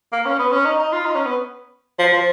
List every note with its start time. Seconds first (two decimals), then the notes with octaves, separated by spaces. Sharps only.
0.12 A#3
0.26 C#4
0.39 B3
0.52 C#4
0.66 D#4
0.79 D#4
0.93 F4
1.05 D#4
1.15 C#4
1.26 B3
1.99 F3
2.13 F3